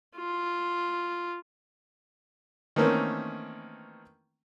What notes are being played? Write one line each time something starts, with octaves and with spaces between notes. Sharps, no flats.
F4
D#3 E3 A3 A#3 C4 C#4